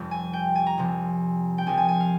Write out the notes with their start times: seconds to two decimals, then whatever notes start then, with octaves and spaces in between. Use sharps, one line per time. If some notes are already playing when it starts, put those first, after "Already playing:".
Already playing: F1 F2 C3 G3
0.11 G#5
0.33 G5
0.55 G#5
0.66 A#5
0.78 C2 C3 F3
1.58 G5
1.66 C2 C3 F3 G#5
1.78 G#5
1.88 G#5
2.00 F5